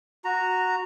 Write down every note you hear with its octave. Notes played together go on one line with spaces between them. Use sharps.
F#4 A#5